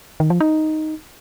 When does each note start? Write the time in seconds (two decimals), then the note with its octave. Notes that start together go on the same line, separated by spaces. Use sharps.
0.20 D#3
0.30 F3
0.41 D#4